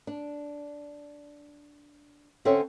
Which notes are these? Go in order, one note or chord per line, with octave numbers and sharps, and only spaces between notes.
D4
D3 C4 C#4 A4 C#5 E5